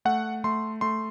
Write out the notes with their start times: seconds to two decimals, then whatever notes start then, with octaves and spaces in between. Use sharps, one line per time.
0.05 A3 F#5
0.44 A3 C6
0.81 A3 C6